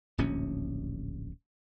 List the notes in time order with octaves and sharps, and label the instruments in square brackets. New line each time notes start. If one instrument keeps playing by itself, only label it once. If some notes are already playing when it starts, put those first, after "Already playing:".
[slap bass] D1 A#1 D#2 C#4